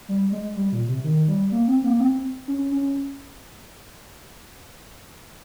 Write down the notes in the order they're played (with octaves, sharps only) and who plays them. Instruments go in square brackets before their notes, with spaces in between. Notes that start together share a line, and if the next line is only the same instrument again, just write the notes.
[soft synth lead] G3
G#3
G3
A#2
C3
D#3
G3
A#3
C4
A#3
A#3
C4
C#4
C#4